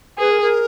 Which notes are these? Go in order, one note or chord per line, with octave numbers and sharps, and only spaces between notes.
G#4 B4
A#4
A#4